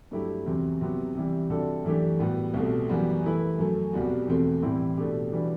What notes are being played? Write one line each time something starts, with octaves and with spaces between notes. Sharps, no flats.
G2 F#3 A3 E4 G4
E2 C3 F#3 C4
C3 F#3 B3
C3 E3 G3
C3 G3 D4 F#4 A4
F#2 E3 A3 D4 G4
A2 G3 B3 F#4
C2 B2 A3
F#2 E3 G3 B3 F#4
E3 A3 E4 B4
F#2 F#3 A3
C2 B2 G3 B3 F#4
E2 B2 A3 C4
A2 E3 G3 C4 E4
B2 A3 D4 G4
E3 G3 D4 F#4 B4